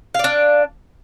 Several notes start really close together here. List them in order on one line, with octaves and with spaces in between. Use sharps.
F5 D5 D4